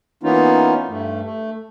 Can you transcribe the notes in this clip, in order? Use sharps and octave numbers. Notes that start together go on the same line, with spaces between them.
E3 A#3 B3 C#4 D#4 F4
G2 A3
A3